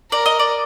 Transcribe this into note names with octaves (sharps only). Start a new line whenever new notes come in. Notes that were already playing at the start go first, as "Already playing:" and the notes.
A#4 D5
D#5
D5